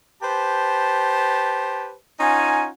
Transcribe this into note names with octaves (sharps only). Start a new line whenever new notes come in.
G4 B4 C5 A5
C#4 D#4 F4 F#5 G#5